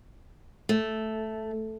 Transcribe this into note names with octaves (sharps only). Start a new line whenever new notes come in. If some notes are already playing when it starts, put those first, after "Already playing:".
A3